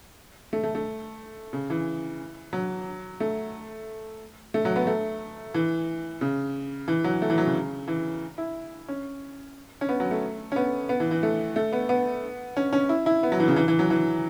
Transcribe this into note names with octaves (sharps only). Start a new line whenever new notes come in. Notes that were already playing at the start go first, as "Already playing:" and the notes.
A3
A3
A3
C#3
E3
F#3
A3
A3
F#3
B3
A3
E3
C#3
E3
F#3
A3
E3
F#3
C#3
E3
E4
C#4
C#4
B3
F#3
A3
C#4
B3
B3
E3
E3
A3
A3
B3
B3
C#4
C#4
E4
E4
B3
F#3
E3
C#3
E3
E3
F#3
E3